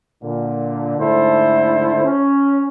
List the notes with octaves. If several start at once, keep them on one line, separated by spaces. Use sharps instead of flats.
A#2 D3
G#2 D3 A3 E4 A4 C5
C#4